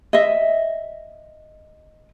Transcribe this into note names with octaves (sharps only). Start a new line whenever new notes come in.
D#5 E5